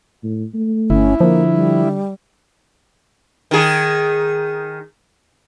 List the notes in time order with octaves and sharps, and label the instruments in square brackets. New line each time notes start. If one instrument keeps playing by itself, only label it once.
[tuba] A2
A3
[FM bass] G1 [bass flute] C#4 [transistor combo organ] E4
[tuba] D3 [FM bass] F3 [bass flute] A#3
[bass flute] G3
[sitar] D#3 G#4